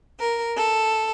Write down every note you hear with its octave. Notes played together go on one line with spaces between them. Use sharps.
A#4
A4